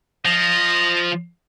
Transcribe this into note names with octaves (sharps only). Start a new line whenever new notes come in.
F3 D#5